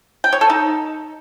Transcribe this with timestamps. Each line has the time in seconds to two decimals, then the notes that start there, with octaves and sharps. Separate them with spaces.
0.24 G5
0.33 C#5
0.41 A4
0.50 D#4